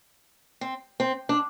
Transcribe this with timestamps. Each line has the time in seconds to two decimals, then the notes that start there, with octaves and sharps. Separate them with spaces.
0.61 C4
1.00 C4
1.29 D4